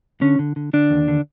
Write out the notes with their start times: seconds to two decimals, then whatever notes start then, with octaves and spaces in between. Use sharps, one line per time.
0.21 D3 C#4
0.39 D3
0.56 D3
0.73 D3 D4
0.90 D#2
1.08 D3